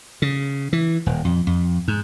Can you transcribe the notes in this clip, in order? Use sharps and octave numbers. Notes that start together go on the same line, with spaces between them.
C#3
E3
D#1
F2
F2
G#2